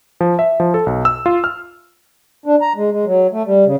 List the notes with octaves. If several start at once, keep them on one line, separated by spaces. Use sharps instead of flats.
F3
E5
F3
A4
B1
E6
F4
F6
D4
A#5
G#3
G#3
F#3
A3
G3
C#3